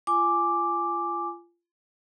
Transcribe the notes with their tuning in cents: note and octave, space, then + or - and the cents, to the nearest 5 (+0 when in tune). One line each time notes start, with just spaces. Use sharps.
F4 -25 G#5 +0 D6 +0